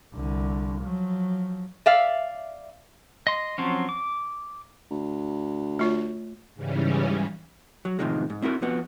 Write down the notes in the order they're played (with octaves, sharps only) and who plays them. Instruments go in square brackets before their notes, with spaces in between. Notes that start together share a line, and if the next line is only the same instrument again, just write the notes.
[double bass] C2 D3
F3 F#3
[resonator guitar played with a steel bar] D5 E5 F5
[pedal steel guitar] D#5 C6
F3 F#3 C4 C#4
D6
[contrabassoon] D2
[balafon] A3 F4 C#5
[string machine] G#2 C#3 E3 G3 C#4
[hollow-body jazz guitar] F#3
A2 C3 D#3 F3 G#3
G#2
C4 E4 F#4 A#4
F2 F3 B3 F#4